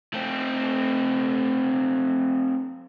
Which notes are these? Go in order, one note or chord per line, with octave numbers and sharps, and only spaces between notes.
A3 C4